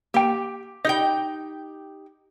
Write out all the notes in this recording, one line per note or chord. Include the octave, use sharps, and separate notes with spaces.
A#3 G4 G5
D#4 G4 D#5 G5 G6